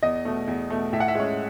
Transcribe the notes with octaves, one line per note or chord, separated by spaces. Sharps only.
E2 D#5
B2 A3
E2
B2 A3
A2 E5
F#5
E5
G#3 C#4